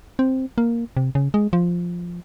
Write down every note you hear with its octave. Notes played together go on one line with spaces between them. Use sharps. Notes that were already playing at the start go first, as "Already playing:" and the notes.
C4
A#3
C3
C#3
G#3
F3